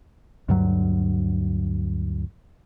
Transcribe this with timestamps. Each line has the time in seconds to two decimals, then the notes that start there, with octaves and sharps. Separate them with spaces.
0.49 D2 G2 F#3